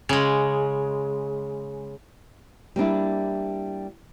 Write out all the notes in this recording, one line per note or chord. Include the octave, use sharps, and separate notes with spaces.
C#3 G#3
G3 A#3 D4 E4